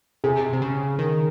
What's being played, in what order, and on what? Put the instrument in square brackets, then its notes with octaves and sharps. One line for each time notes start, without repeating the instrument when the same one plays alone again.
[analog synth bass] C3 [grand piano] G#4
[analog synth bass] C3
C#3
D#3